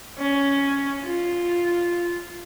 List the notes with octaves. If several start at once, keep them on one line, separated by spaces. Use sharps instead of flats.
C#4
F4